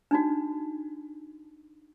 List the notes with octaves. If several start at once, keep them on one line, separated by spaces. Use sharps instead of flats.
D4 D#4 F#4